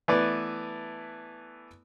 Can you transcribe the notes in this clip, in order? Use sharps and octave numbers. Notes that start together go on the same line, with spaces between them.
E3 A3 B3 D5